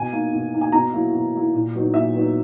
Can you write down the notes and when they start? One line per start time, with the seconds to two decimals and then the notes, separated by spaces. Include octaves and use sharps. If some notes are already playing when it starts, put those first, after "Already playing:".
Already playing: B2 G#5
0.13 A#3 D#4
0.33 B2
0.53 A#3 D#4
0.61 G#5
0.72 B2 A#5
0.94 F#3 A#3 E4
1.13 B2
1.33 F#3 A#3 E4
1.54 A#2
1.75 F#3 B3 D#4
1.94 A#2 E5
2.14 F#3 B3 D#4